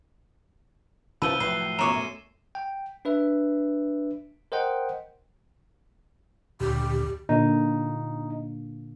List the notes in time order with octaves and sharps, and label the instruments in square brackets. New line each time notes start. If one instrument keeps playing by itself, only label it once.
[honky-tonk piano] C2 A5 [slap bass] C#3 [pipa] F3 B4 [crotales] E6 D#7 G7
[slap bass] A2 F3 F#3 [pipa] B4 [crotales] C7
[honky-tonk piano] F#2 B2 D6 [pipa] A#4 C#5 [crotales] C#7 E7
[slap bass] A3
[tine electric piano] G5
D4 B4 E5
A#4 C5 D#5 F#5 G5
[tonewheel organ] D2 A#2 D3 [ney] G4
[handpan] A#2 D3 A#3 [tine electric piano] D#4